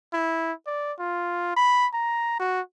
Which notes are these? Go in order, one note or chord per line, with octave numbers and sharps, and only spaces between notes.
E4
D5
F4
B5
A#5
F#4